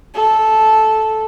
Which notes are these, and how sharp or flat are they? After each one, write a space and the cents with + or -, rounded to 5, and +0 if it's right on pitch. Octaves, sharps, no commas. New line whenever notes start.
A4 -10